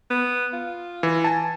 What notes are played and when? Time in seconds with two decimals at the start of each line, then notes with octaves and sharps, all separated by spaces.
0.10 B3
0.53 F4
1.03 E3
1.24 G#5 A5